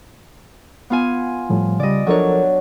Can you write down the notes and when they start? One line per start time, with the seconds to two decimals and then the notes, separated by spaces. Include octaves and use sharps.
0.90 B3 F4 G#5
1.49 A2 F3 G3
1.80 C#3 G3 D5 D#5
2.07 F3 F#3 D4 A4 A#4 C#5